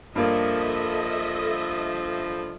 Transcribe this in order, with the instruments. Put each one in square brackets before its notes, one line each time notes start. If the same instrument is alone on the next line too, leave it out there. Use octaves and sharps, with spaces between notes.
[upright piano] G2 A#3 [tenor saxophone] F3 [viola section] A4 D#5 E5